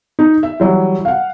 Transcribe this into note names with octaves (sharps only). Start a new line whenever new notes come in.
D#4
E5
E3 F#3 G3
F5 F#5